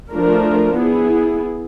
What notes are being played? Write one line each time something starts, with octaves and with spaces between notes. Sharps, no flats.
F3 A3 D4 F4 A#4
B3 E4 G#4